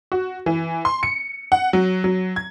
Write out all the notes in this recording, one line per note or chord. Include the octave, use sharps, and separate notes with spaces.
F#4
E3
C6
C#7
F#5
F#3
F#3
G#6